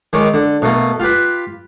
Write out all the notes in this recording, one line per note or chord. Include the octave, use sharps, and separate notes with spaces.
D#3 G#3 C#5 D6
D3
B2 A3 A#3
F4 G4 B4